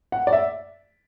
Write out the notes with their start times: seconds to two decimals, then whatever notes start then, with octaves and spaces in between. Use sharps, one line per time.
0.12 F#5
0.27 D5
0.33 E5